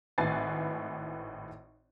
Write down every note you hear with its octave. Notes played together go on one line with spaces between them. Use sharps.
G#1 A2 B4 G#5 A6 C7